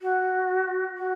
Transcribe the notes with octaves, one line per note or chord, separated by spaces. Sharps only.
F#4
F#4